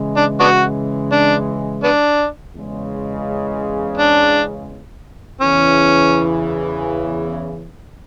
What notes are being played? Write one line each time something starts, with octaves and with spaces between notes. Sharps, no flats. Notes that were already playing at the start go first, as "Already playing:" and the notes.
Already playing: C#3 E3 G#3
D4
B3 D4 F#4
D4
B3 D4
E2 C#3 G#3
D4
E2 C#3 E3 C#4